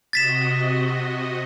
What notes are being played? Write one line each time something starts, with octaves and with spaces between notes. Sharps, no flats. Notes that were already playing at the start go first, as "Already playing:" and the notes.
C3 F#4 D#5 A6 B6 E7